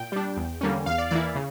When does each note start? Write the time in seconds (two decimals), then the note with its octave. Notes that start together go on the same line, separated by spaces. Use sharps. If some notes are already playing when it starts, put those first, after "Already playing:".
Already playing: A#2 G5
0.12 G3 D4
0.37 E2
0.61 D3 G3 A#3 C#4
0.86 E2 F5
0.98 D5
1.11 E3 A#3 E4 D5
1.35 C#3